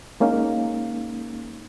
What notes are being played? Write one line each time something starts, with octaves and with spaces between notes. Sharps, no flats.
G#3 A#3 C#4 D#4 F5